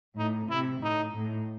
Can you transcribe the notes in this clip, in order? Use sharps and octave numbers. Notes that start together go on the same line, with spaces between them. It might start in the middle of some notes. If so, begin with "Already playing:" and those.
A2 D#4
C3 E4
A2 D#4
A2